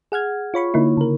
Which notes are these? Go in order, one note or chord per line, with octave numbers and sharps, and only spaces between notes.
G#4 F#5 F6 G#6
F4 C#5 B5 C#6
D3 A#3 D#4 E4
C#3 A#4